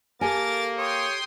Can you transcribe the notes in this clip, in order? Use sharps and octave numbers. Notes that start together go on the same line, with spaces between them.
A#3 G4 A4 A#4 G#5 A6
C#5 G5 C6 D#6